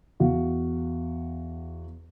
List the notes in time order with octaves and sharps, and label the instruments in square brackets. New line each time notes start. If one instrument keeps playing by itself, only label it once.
[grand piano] E2 F#4 F5